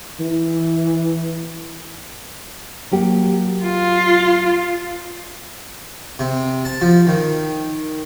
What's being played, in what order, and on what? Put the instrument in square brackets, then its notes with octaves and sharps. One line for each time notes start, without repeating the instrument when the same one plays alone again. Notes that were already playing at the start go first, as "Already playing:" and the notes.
[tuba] E3
[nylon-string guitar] F#3 A#3 G4
[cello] F4
[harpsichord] C3
A5
F3
D#3